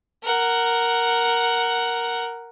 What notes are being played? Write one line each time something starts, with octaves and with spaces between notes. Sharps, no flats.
A#4 F#5